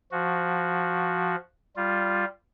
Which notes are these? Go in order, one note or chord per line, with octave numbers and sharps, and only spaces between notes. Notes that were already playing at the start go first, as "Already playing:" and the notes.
F3 F#4
G3 F4